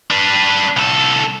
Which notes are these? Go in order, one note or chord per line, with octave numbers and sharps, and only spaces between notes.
D4 B4
C2 A4